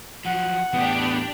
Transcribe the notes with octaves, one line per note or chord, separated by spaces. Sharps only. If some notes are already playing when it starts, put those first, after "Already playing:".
F3 F#3 F#5
E2 A2 B3 D4 G4